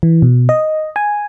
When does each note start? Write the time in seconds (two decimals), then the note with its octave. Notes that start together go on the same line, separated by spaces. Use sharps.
0.03 E3
0.22 B2
0.49 D#5
0.96 G#5